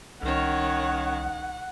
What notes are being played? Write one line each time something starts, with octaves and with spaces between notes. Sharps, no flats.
C2 D#3 C#4 C#5 F#5